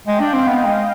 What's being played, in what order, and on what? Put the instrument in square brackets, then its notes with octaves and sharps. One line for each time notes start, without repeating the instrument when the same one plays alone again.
[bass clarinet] G#3 [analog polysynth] G5
[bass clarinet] D4
[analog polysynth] F5
[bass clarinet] C4
[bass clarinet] B3 [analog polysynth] D#5
[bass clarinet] G#3